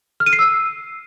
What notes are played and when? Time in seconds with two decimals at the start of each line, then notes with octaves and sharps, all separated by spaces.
0.20 F6
0.26 D#7
0.33 C7
0.39 E6